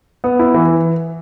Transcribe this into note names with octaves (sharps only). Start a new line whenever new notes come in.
B3
E4
E3